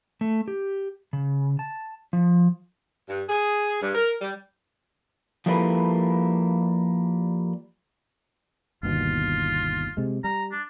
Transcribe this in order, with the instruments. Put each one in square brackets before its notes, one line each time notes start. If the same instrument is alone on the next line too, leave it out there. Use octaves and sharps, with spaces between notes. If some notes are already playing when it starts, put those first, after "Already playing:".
[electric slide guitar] A3
G4
C#3
A5
F3
[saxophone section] G2
G#4
G2
A#4
G3
[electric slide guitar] F3 G3 A#3 E4 A4 B4
[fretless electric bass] G1 D#2 B2 [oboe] F4
[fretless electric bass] C3 G#3
[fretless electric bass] G3 [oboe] A#5
[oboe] D4